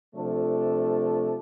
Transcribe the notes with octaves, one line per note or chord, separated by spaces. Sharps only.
C3 F3 A3 D4 A4